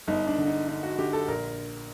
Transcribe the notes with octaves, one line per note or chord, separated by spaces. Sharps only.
G1 D#4
D4
D3
D#4
D3 D#4
F#4
D3 G4
A4
A#1 A#4